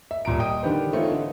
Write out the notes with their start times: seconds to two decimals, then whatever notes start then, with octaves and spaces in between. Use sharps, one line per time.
0.11 E5
0.25 D#1 A#2 A#5 D7
0.40 D#5 G5 D#6 D7
0.63 D3 D#3 D4 G4 B4 C5
0.93 E3 A3 C4 D#4 F4 C#5
1.12 D3